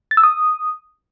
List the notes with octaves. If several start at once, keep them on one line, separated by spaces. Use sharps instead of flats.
A6
E6
D#6